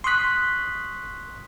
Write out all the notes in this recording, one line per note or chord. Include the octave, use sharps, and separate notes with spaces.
C6 C#6 D#6 F#6 B6